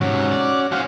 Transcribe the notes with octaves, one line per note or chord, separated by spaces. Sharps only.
G#2 C3 C#4 F#4
D5
C#4 F#4 C5 F5